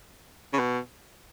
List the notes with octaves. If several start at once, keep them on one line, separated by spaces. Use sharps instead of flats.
C#3
B2